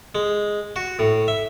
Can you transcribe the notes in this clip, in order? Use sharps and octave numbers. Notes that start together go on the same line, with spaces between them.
G#3
F#4
A2
E5